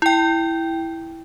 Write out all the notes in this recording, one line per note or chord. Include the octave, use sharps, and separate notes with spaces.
E4 G5